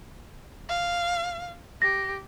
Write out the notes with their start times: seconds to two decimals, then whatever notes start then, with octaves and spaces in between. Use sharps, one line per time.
0.69 F5
1.82 G4 A#6